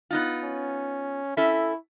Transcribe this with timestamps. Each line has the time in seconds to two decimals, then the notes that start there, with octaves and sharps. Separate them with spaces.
0.10 B3 D#4 F4
0.43 C#4
1.37 C#4 E4 A4 E5